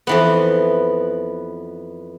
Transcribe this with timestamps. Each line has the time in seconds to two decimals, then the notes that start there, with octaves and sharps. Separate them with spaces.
0.07 F2 E3 B3